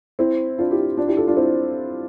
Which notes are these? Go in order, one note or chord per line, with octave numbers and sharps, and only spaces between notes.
C4 E4
D4 F4
E4 G4
D4 F4
E4 G4
F4 A4
D4 F4
C4 E4